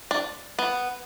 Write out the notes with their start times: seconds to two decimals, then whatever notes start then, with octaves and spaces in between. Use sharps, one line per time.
0.11 D4
0.59 B3